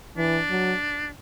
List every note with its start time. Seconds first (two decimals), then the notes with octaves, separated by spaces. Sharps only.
0.17 E3 D4
0.50 F#3